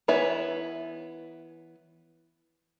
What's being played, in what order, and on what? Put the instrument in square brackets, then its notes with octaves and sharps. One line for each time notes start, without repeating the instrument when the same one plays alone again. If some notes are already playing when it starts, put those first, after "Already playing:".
[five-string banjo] E3 B3 C#5 E5